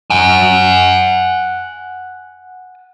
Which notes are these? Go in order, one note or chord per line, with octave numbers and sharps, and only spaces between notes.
F#5 G#5